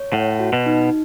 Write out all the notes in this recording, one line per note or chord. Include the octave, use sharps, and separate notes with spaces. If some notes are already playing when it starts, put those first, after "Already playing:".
Already playing: C#5
A2 F#5
F#4
B2
D#4